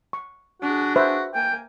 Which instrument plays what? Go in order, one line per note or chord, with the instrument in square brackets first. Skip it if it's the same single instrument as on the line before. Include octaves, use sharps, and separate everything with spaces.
[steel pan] C#6
[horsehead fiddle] D4 G#4 [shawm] F#4
[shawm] F#4 [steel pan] B4 C5 E5
[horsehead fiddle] A#3 G#5 [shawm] G5